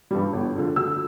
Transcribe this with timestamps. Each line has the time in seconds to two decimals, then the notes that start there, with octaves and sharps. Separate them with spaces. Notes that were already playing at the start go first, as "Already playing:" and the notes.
0.11 G2 E3 G3
0.33 G1
0.55 F2 D3
0.76 D2 E6